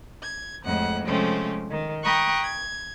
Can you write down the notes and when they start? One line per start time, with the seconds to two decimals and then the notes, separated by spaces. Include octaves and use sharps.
0.22 G#6
0.63 F2 A2 G#3 F#5
1.04 C3 F3 G#3 A3 C4 C#4
1.69 D#3
2.02 G5 A#5 B5 C#6 D#6 F#6
2.42 G#6